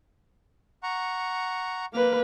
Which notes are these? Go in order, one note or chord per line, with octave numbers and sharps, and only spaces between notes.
F#5 A#5 C#6
A#3 B4 D6 F6